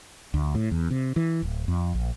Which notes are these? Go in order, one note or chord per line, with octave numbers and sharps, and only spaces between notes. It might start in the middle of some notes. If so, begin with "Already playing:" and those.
D2
A2
E2
C3
E3
D1
F2
A#1